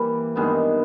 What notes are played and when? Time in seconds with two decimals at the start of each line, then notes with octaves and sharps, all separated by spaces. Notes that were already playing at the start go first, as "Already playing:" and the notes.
Already playing: E3 G3 A#3
0.35 G2 D#3 G#3 B3